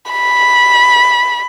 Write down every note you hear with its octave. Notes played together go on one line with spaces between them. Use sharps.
B5